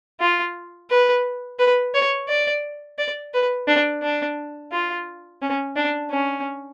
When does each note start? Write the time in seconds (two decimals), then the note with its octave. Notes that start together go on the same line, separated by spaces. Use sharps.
0.20 F4
0.90 B4
1.59 B4
1.94 C#5
2.28 D5
2.99 D5
3.34 B4
3.68 D4
4.03 D4
4.72 F4
5.42 C#4
5.76 D4
6.11 C#4